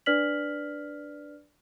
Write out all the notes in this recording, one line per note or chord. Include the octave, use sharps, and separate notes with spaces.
D4 B4 D5 F6 B6 F#7